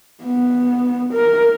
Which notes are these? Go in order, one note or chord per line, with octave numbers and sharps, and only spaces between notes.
B3
A#4